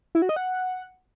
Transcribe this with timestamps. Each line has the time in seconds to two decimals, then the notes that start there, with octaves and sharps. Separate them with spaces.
0.15 E4
0.22 F#4
0.29 D#5
0.36 F#5